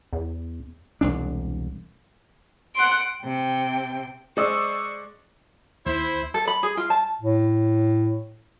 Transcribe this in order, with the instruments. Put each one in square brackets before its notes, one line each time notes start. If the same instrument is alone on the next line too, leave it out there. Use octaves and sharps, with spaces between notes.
[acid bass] E2
[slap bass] E1 C2 D4
[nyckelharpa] F#5 C6 [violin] D7
[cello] C3 G5
[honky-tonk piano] G#3 D5 [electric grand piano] C5 D#6 E6 [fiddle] C#6
[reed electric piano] D#2 [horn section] E4 C5
[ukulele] A4
B5
G#4
F4
A5
[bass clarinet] A2